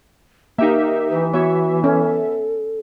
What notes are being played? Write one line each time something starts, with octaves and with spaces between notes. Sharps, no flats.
A#3 D#4 G4 A#4 E5
E3 B4
B3 F#4 C#5 E5
C#4 A4